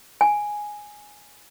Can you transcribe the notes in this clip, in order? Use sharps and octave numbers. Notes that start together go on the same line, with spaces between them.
G#5